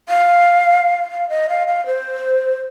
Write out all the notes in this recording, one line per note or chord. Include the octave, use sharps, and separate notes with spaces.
F5
F5
D#5
F5
F5
C5